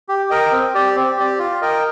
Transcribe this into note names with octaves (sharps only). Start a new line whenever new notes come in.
G4
A#4 D#5 G5
C4
G4 D5
C4
G4 D5
F4
A#4 D#5 G5